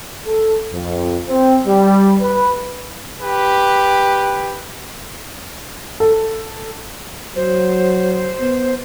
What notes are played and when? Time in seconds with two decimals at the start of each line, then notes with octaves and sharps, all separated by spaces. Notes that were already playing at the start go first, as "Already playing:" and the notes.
0.26 A4
0.73 F2
1.29 C4
1.67 G3
2.22 B4
3.21 G4 B4
6.00 A4
7.36 F#3 C5
8.41 B3